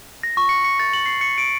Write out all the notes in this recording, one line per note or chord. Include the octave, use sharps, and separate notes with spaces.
A#6
C#6
C#7
C#7
A6
F#7
C7
C#7
D7